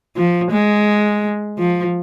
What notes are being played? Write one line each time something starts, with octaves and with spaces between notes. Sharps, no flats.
F3
G#3
F3